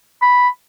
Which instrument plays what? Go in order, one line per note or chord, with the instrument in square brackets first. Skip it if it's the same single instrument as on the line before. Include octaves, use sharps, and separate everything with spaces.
[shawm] B5